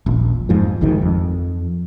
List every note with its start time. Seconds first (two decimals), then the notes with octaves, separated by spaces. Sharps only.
0.06 D#1 A#1
0.49 F2 G#2 F3
0.81 G#1 D2 G#2 D#3
1.02 F2